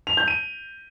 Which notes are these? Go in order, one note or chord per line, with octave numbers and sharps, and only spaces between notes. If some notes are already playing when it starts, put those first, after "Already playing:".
F7
G6
D#7